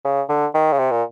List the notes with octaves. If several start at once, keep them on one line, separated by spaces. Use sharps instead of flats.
C#3
D3
D#3
C#3
C3
A#2